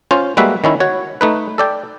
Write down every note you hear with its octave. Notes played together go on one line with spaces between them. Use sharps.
C#4 F4 C5
G3 G#3 A#3 F#4 B4 E5
D#3 C#4 E4
F#4 C#5
A3 D#4 B4
A4 D5 G5